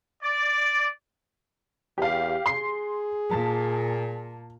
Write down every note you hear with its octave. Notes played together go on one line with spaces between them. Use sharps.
D5
E2 G4 F5
G#4 C6 C7
A#2 A5